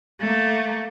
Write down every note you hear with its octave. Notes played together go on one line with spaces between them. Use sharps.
A3 A#3